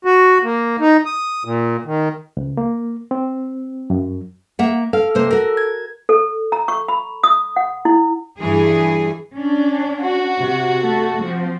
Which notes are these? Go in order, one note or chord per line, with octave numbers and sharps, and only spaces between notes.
F#4
A#3
D#4
D#6
A#2
D#3
C#2
A#3
C4
F#2
A#3 E5 F#5
A4 F5
C3 A#3 C5
F#4 A4 A#4
G#6
A4
A#5
C#6
B5
D#6
F#5
E4
G2 E3 G#4
C#4 D4
F#4
C3
A3 A4
F3 C4